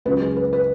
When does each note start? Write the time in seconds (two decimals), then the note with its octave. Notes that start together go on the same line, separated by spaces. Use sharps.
0.05 C#2 C#3 F#3 B4
0.20 G#4
0.36 B4
0.53 B4